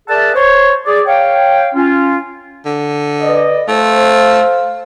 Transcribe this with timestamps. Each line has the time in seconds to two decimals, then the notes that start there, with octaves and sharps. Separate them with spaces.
0.09 G#4 A#4 D5 E5 F#5 A5
0.35 C5 C#5
0.86 G#4 D5
1.06 C#5 F5 G5
1.75 C#4 F4
2.66 D3
3.22 B4 D5 D#5
3.68 A3 C5 F5